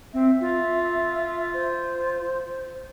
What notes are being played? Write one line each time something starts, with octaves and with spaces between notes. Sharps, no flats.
C4 E5
F4
C5